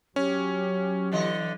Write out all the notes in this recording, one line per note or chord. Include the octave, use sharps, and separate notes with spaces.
F#3 C#4 G4
D3 E3 D#5